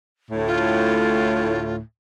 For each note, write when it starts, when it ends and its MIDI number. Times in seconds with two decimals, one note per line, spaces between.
0.31 1.81 38
0.31 1.81 45
0.47 1.76 65